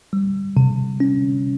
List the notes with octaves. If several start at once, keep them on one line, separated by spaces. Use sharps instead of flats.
G3
C3
C#4